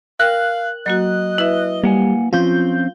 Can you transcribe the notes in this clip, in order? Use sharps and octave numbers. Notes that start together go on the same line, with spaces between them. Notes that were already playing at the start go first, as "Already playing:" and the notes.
A#4 F5 G5 F#6
F#3 A#3 F#4 D#5
E4 B4 E5
G3 A#3 F#5 G#5
F3 C4 C#4 F4 G6